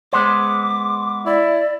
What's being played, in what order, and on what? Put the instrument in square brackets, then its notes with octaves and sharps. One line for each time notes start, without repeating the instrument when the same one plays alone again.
[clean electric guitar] G#3 B3 C5 [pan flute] D6
[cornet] E4 [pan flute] D5